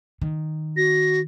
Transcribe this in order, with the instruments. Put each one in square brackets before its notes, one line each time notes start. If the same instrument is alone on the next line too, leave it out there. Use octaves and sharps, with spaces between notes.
[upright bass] D#3
[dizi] F#4 [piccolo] A#6